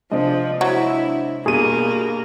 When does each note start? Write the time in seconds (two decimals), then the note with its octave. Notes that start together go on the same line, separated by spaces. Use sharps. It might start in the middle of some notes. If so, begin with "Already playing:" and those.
0.12 C3 F3 G#3 C4 D4 D#5
0.61 F#3 E4
1.46 G2 B2 A#3 G#4 D#7